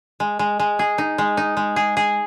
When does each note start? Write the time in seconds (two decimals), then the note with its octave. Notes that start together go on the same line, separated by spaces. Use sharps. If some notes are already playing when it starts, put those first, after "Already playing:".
0.20 G#3
0.39 G#3
0.59 G#3
0.79 G#4
0.98 D#4
1.18 G#3
1.37 D#4
1.57 G#3
1.76 G#4
1.97 G#4